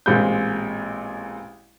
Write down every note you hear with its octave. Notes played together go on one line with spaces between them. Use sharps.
A1 A#2 G#3 C4 B5 G6